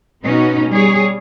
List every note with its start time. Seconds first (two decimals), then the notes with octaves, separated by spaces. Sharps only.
0.24 B2 B3 C#4 D#4 F#4
0.69 G3 G#4 C#5